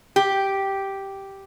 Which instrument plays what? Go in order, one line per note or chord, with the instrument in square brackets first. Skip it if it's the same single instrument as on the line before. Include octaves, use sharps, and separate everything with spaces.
[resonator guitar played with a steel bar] G4